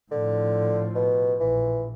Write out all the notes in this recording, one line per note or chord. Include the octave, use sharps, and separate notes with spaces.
A2 D3 F3
B2
A#1 E3